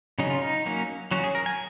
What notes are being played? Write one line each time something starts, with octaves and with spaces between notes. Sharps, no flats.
C#3 F#3 C#4 D#4
F4
D#4
F#3 A#3 C#4
F#3 C#4 F#4
G#4
A#4
G#5